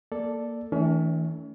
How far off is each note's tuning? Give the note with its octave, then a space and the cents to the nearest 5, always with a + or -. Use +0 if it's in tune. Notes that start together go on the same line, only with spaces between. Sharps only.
A#3 +0 A4 +0 D5 +0
E3 -35 A3 +0 C#4 +40